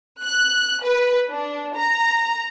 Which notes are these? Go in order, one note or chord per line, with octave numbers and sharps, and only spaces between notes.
F#6
B4
D4
A#5